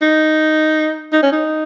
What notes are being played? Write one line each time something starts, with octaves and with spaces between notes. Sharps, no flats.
D#4
D#4
C#4
D#4